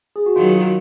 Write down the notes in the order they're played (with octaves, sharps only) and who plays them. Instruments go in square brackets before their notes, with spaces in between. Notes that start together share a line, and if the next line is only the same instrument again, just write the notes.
[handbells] G#4
F#4
[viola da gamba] D#3 F#3 [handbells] F4